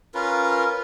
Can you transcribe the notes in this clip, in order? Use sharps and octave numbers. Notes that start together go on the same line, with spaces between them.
C#4 F4 A#4 B4